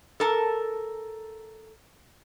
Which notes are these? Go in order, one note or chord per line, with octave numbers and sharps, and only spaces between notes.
A4 A#4 A5